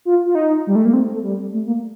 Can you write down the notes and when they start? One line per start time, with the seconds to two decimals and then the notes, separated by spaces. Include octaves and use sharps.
0.05 F4
0.26 F4
0.35 D#4
0.67 G3
0.76 A3
0.85 A#3
0.93 C4
1.13 A3
1.23 G3
1.53 A3
1.67 A#3